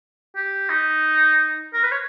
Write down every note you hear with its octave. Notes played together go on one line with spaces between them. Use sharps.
G4
D#4
A#4
B4
C#5